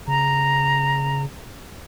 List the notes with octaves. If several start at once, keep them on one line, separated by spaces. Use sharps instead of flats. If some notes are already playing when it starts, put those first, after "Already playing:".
C#3 A#5